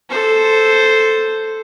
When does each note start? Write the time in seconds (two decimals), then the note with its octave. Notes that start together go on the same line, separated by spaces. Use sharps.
0.10 A4 C5